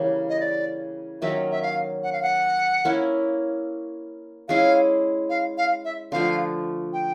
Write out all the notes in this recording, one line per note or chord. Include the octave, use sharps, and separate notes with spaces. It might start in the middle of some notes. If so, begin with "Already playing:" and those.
Already playing: C#3 E3 G3 A#3
D#5
D5
D#3 F#3 A#3 C#4 E5
E5
F5
F#5
F5
F#5
A#3 C#4 E4
G#3 C#4 E4 G#4 F5
F5
F5
E5
D3 F3 A3 F5
G5